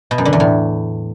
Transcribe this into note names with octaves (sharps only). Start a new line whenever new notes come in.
B2
F#2
D3
E2
A2